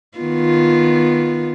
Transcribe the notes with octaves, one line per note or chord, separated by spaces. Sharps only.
D#3 B3 F4